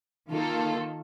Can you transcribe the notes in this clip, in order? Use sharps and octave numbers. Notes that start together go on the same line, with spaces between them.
D#3 A#3 F4 A4